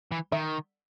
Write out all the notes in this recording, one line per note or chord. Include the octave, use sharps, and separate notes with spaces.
E3
D#3 E5